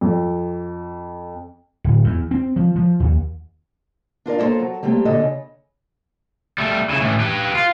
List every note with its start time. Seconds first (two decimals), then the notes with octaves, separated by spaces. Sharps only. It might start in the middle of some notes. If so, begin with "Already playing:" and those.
0.01 F2
1.84 D1
2.04 E2
2.31 C4
2.56 F3
2.76 F3
3.00 D#2
4.26 D4 F4 A#4 D5
4.38 A#3 E4 F4 A4 C5
4.60 F#3
4.83 G3 A3 A#3 C4 G4
5.05 A#2 D3 A4 D#5
5.20 C#3
6.58 G3 A3
6.90 C#3 E4
7.01 A2 E3
7.20 G4 B4
7.55 F4